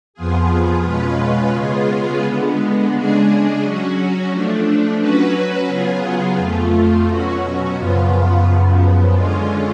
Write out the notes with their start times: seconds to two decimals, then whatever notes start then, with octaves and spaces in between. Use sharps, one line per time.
0.14 F2 F3 B3 F4 G#4
0.83 B2 G#3 C#4 F4 B4
1.53 C#3 G#3 B3 F4 G#4
2.21 D3 G#3 B3
2.91 C#3 G#3 D4 G#4
3.60 F#3 C#4 F#4
4.29 F3 A3 D4
4.98 F#3 C#4 F#4 B4
5.67 C#3 F#3 B3 F4 G#4
6.36 F2 F3 A3 F4
7.05 B2 F#3 C#4 F#4
7.75 F#2 C#3 F3 B3 F4
8.44 F#2 C#3 F3 B3
9.14 D3 G#3 C#4 F4